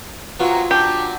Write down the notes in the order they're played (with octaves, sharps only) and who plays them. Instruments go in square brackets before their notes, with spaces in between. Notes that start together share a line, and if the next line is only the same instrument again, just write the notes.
[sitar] C3 F#3 A#3 [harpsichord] B3 F4 F#4
[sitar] F#3 [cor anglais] D4 [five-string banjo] G4